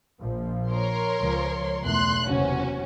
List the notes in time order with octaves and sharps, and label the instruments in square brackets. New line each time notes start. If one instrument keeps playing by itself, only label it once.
[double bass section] A#1 F3
[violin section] A#4 C#5 C6
[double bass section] C#2 F3
[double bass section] B1 E2 A3 [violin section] C6 F#6
[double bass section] F#1 E2 C3 [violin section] C#4 F#4